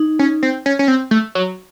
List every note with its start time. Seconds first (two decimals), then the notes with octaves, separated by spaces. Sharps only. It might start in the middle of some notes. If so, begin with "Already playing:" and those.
Already playing: D#4
0.19 C#4
0.43 C4
0.66 C#4
0.79 C#4
0.88 C4
1.11 A3
1.35 F#3